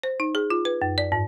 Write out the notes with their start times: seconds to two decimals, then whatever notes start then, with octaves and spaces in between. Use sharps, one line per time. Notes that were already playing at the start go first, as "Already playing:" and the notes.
0.03 C5
0.20 D#4
0.35 G#4
0.50 F4
0.65 B4
0.82 F#2
0.98 D5
1.12 G#2